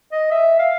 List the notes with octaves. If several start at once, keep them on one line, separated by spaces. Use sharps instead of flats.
D#5
E5
F5